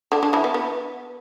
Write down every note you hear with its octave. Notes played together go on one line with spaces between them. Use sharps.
D3 D4
D3 D4
E3 E4
B3
B3